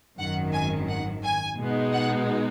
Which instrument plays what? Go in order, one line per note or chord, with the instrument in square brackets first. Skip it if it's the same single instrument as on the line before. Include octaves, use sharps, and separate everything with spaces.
[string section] G#1 F#2 D#3 F#5
G#5
F#5
G#5
B2 G#3 B3 D#4
F#5